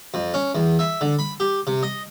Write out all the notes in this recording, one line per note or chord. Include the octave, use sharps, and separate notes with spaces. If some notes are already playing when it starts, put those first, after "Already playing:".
F2
C#4
E2
E5
D3
B5
G4
C3
D#5